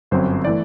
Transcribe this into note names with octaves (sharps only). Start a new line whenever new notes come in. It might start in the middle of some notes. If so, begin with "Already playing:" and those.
G1 F#2 F#3 C4 C5
E3 A3 D5